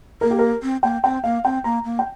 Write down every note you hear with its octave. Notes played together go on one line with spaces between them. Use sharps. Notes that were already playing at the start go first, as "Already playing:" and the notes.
A#3 A#4
G4
A#4
C4
A#3 G5
C4 G5
A#3 F5
C4 G5
A#3 A#5
A#3
G5